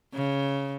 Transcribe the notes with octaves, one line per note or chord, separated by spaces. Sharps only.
C#3